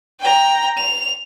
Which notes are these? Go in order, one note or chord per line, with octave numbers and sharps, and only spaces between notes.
G5 A#5
F7